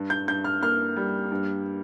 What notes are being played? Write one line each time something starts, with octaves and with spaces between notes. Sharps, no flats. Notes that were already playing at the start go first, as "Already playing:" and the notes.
Already playing: G2
G6
G2 G6
F6
A#3 F6
G3
G2